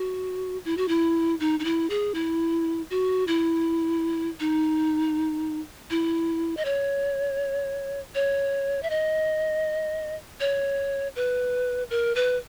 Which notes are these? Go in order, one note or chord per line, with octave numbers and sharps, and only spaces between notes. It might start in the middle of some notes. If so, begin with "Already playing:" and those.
Already playing: F#4
E4
F#4
E4
D#4
D#4
E4
G#4
E4
F#4
E4
D#4
E4
D#5
C#5
C#5
E5
D#5
C#5
B4
A#4
B4